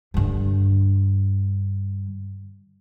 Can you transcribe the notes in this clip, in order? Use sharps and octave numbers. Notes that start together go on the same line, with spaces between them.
G2 D3